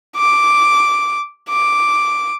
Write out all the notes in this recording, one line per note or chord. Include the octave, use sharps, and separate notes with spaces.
D6
D6